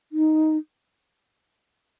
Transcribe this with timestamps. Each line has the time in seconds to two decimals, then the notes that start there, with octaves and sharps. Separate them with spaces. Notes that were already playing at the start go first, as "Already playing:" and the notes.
0.12 D#4